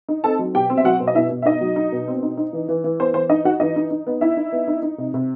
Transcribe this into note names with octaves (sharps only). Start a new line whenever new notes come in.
D#4
C4 A4 A5
F#3
B2 G4 G5
C4
E5
F#3 F#4 F#5
B2
D#5
B2 E4 E5
B2
E5
D#4 D#5
F#3
D#4
B2
C4
D#4
D#4
E3
E3
E3
B3 C5
E3 C5
D#4 D#5
D#4 F#4 F#5
E3 D#4 D#5
D#4
D#4
B3
D#4 E4 E5
D#4
B3
D#4
D#4
C3
C3